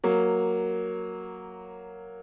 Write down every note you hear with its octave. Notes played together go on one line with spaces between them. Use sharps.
F#3 A#3